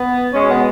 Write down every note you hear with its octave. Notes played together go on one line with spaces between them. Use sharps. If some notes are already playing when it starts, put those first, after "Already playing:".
Already playing: B3
B2 G#3 C#4
B3